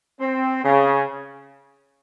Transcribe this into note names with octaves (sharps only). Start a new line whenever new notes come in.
C4
C#3